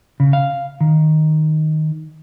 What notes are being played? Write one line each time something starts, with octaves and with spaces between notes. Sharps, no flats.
C#3
F5
D#3